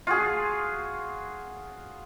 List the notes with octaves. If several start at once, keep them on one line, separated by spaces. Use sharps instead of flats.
F4 F#4 G#4